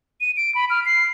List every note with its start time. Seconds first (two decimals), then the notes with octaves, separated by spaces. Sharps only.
0.21 D#7
0.37 D7
0.55 B5
0.70 F6
0.85 C7